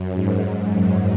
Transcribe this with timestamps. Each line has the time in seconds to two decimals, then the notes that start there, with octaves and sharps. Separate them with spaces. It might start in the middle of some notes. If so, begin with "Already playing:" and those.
Already playing: F#2
0.14 G#2
0.72 F#2